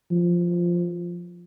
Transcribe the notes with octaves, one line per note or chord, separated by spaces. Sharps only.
F3